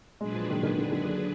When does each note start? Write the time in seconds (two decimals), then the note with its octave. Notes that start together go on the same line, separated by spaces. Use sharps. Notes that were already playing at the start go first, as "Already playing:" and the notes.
0.21 A#2 F#3 G#3 D4 G#4 B4
0.35 F3
0.50 D#3
0.63 D#3
0.77 D3
0.92 D3
1.05 D3